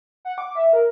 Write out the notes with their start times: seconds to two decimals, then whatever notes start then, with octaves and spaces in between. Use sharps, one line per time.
0.25 F#5
0.38 D6
0.55 E5
0.73 A#4